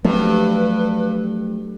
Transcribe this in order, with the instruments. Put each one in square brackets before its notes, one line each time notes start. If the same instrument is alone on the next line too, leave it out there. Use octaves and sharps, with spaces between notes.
[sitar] G2 [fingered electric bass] F3 F#3 A3 [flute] B4